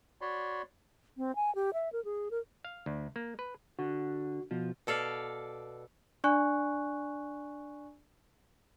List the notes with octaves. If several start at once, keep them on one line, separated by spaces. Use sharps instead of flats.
F#4 C#5 D5 B5 C6
C4
G#5
G4
E5
A#4
G#4
A#4
F5
D2
A#3
B4
D3 F#4
B2 F3
B2 A4 D5 F5
D4 D5 G#5 C#6 F#6